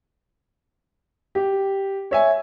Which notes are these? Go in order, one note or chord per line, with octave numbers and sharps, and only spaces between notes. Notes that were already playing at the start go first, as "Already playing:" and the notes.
G4
C#5 E5 G#5